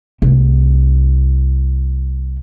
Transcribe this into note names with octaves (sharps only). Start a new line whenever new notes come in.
C2 A3